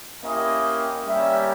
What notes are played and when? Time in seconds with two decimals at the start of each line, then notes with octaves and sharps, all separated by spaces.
0.24 A#3 C#4 E4 G4 D#5
1.07 G3 A#3 C#4 G4 E5